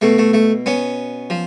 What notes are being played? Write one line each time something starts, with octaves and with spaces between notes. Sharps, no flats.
B2 A3
A3
A3
B3 C#4
F3